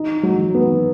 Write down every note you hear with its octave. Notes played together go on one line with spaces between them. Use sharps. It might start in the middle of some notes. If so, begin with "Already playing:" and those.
Already playing: D#4
F#3
B3